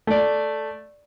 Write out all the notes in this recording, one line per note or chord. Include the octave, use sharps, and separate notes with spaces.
A3 D5